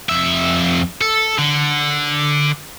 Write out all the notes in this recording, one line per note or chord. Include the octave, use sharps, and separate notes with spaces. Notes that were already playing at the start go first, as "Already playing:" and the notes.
F2 E5
A4
D3